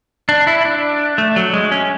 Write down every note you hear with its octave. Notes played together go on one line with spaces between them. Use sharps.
D4
E4
D4
A3
F#3
G#3
C#4